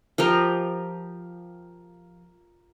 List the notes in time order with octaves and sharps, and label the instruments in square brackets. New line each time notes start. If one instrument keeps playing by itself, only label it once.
[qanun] F3 G4 A#4